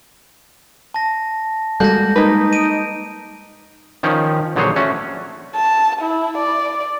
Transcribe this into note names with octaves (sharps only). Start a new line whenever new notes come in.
A5 A#6
G3 G#3 A#3 F#4 A4 G6 A#6
A#3 D#4 B4
D7 D#7
D#3 F3 C#4 D#4
A#1 D3 F#3 G#4 C5 C#5
A3 C#4 F#4
A5
E4
D5